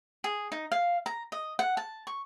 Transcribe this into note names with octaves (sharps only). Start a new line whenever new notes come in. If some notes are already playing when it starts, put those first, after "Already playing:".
G#4
D#4
F5
A#5
D#5
F#5
A5
C#6